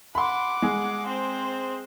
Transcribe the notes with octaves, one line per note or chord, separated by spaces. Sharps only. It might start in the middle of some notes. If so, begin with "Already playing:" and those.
F#5 B5 C6 D6
G#3 G#4
C4 C5